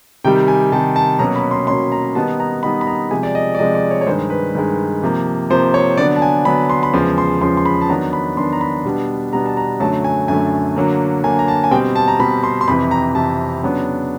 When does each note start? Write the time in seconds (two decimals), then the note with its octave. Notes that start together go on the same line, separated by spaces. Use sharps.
0.24 C3 D#3 G3 G5
0.48 G#5
0.72 C3 D#3 G3 A5
0.96 A5
1.19 B2 F#3 A#3 C#4 A#5
1.36 B5
1.51 C6
1.67 B2 F#3 A#3 C#4 C6
1.92 A#5
2.15 D#3 G3 B3 D#4 A5
2.40 A#5
2.63 D#3 G3 B3 D#4 B5
2.81 B5
2.87 A#5
3.11 C3 F3 G#3 G#5
3.23 D5
3.35 D#5
3.55 D5
3.59 C3 F3 G#3 D#5
3.75 D5
3.91 C#5
4.01 C#5
4.07 G2 D#3 G#3 C5
4.30 B4
4.55 G2 D#3 G#3
5.03 C3 F3 A#3
5.50 C3 F3 A#3 C5
5.74 C#5
5.97 D3 F#3 B3 D5
6.16 A5
6.22 G#5
6.45 D3 F#3 B3 B5
6.70 C6
6.83 B5
6.93 E2 C#3 F3 G#3 C6
7.18 C6
7.41 E2 C#3 F3 G#3 C6
7.57 C6
7.66 B5
7.81 A5
7.89 D#3 F#3 B3 D4 A#5
8.13 B5
8.37 D#3 F#3 B3 D4 C6
8.53 A#5
8.61 B5
8.85 B2 G3 B3 D4
9.33 B2 G3 B3 D4 A#5
9.46 A5
9.57 A#5
9.80 F#2 D3 F#3 A3 A5
10.04 G#5
10.28 F#2 D3 F#3 A3 G#5
10.76 D3 F#3 A#3
11.24 D3 F#3 A#3 G#5
11.39 A#5
11.48 A5
11.64 G#5
11.71 B2 G3 C4 G5
11.95 A5
12.08 A#5
12.19 B2 G3 C4 B5
12.44 C6
12.61 C6
12.68 F2 C3 E3 B5
12.91 A#5
13.15 F2 C3 E3 A5
13.63 C#3 F#3 B3 D4